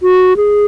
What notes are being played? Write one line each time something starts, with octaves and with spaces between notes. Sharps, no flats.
F#4
G#4